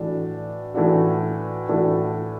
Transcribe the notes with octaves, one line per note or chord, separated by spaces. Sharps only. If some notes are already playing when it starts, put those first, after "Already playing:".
Already playing: A2 E3 D4 F#4
A2 E3 D4 F#4
A2 E3 D4 F#4